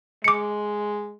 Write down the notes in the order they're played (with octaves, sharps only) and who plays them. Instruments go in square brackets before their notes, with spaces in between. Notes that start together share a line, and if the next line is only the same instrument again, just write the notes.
[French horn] G#3 [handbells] D6 C#7